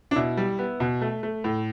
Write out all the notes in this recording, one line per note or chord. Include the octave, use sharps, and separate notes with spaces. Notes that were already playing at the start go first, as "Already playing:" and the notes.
D4
B2 E4
G3
B3
B2
A3
A3
A2